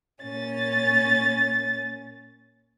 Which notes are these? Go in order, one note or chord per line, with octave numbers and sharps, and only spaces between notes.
A#2 C#4 A6